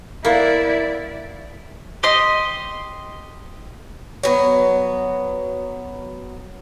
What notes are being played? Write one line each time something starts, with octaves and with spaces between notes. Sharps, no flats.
A#3 B3 E4 D5
G4 D#5 C6
F#3 B3